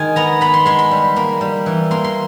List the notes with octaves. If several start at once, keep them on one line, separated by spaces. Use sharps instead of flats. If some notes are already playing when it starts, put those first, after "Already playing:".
Already playing: D#3 G#3 G#5
B3 A#5
B3 B5
C6
G#3 C6
B5
G3
A#3
G3
E3
A#3 C6
C6